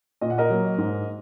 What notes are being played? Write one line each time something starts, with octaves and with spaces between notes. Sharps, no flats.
A#2 D#5
F#5
A#4 D#5
F#3 A#3
G#2